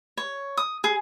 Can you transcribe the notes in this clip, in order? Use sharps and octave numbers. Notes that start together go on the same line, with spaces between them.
C#5
D#6
G#4